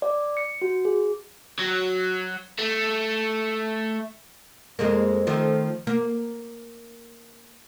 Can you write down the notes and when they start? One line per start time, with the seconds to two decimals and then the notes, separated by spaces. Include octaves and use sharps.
0.02 D5
0.37 C#7
0.62 F#4
0.85 G#4
1.59 F#3
2.58 A3
4.79 F2 G#3 A#3
5.27 D#3 F3 A3
5.87 A#3